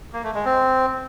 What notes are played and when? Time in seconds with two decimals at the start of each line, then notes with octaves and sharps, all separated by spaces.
0.13 A#3
0.24 A3
0.35 G#3
0.45 C4